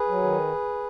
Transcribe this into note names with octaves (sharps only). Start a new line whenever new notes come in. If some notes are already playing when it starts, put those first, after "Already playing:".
Already playing: G#4 B4
F#3
D#3